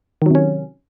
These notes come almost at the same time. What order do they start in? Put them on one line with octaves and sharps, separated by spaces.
D#3 F#3 C3 C#4